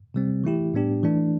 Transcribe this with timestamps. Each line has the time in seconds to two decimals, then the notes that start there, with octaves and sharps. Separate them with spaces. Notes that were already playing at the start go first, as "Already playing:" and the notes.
0.14 C3 G3 C4
0.44 E3 A3 E4 G4
0.74 A2 G3 B3 D4 G4
1.03 E3 A3 D4